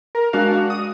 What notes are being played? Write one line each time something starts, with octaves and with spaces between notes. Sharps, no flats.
A#4
G#3 D4 F#4 A#4 F5
D4 F#4
D#6